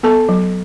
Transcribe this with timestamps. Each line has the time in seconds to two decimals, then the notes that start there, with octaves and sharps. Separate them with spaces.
0.03 B3 A4 A5
0.29 F#3